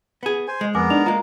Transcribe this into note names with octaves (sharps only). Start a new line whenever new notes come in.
B3 G#4
C5 G#5
G#3
F2 B3 A#4 G#5 A#5 D6
D4 D#4 F7
G#3 A#3 F4 A#5